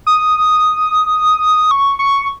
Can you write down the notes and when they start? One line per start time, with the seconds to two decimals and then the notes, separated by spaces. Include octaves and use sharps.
0.07 D#6
1.71 C#6
1.99 C#6